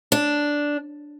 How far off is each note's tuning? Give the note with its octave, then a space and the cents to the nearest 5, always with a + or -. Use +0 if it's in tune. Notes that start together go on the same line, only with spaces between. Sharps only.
D4 -5